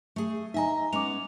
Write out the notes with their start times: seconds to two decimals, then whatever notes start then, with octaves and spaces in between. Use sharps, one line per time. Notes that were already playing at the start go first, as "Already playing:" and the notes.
0.16 A3 G#4
0.54 D#4 D#5 E5 G#5 A#5
0.93 G#3 B3 C#4 D6 F7